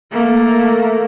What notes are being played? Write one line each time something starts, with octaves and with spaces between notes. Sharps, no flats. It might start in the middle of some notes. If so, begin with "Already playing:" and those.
A3 A#3